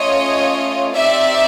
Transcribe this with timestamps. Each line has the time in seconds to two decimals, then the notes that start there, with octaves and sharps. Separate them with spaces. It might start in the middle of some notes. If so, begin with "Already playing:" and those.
Already playing: A3 C#4 F4 C#5 D#5
0.94 C4 D#4 G4 D5 E5